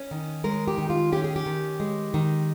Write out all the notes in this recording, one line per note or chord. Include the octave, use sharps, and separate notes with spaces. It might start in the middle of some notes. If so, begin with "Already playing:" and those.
Already playing: C#4
D#3
G#3 A#4
G4
D#3
F4
C#4 G4
G#4
G4
D#3
G#3
D#3